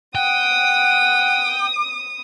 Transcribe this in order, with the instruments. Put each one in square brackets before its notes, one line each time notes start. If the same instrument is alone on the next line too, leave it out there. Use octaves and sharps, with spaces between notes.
[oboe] F#5 [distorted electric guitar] G5 [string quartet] D#6